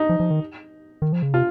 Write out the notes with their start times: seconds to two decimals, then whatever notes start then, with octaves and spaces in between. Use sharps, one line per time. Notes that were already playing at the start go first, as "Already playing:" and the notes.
Already playing: D#4
0.09 F3
0.20 F3
0.30 D#3
1.02 D#3
1.13 F3
1.22 C#3
1.33 C3 F4